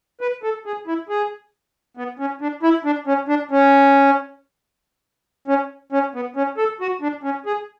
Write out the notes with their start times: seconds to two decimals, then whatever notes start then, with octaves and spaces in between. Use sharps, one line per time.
0.21 B4
0.43 A4
0.66 G#4
0.87 E4
1.09 G#4
1.97 B3
2.19 C#4
2.41 D4
2.63 E4
2.85 D4
3.07 C#4
3.28 D4
3.51 C#4
5.48 C#4
5.92 C#4
6.14 B3
6.36 C#4
6.58 A4
6.81 F#4
7.01 D4
7.23 C#4
7.46 G#4